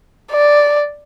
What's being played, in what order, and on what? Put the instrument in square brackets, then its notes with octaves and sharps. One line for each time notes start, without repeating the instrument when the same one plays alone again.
[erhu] D5